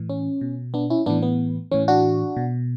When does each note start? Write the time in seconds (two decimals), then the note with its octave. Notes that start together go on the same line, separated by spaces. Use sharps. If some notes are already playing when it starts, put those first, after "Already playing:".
Already playing: A2 E3
0.10 C#4
0.41 B2
0.74 B3 D4
0.90 C#4 E4
1.06 A2 E3 B3 D4
1.23 B3
1.71 A2 E3 C#4
1.88 D4 F#4
2.37 B2